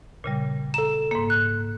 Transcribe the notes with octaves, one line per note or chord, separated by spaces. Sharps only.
A#2 C#3 G3
A4 A#5 E7
G#2 A#3
F#6